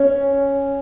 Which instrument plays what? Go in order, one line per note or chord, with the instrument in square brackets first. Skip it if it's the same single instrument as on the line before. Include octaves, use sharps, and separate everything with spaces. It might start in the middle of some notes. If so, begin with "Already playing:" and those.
Already playing: [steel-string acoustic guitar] C#4